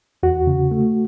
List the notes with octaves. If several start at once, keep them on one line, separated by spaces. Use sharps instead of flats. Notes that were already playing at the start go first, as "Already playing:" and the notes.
E2 F#4
C#3
A3